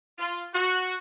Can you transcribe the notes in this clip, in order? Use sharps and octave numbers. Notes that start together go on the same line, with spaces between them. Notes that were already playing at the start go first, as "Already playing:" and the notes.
F4
F#4